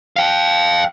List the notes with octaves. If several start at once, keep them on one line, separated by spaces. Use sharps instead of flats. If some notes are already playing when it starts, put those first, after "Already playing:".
F5 G5